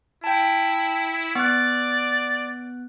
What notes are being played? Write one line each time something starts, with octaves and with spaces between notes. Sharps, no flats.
E4 G5 A5
B3 D5 F#6